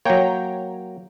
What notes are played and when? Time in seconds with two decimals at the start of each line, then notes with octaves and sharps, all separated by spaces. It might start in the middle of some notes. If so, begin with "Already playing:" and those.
0.05 F#3 A#3 C#5 G5 A#5